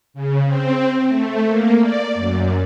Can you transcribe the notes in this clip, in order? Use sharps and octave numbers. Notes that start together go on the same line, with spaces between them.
C#3
C4
A3
A#3
D5
F#2